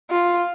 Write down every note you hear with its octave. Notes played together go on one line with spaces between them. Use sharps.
F4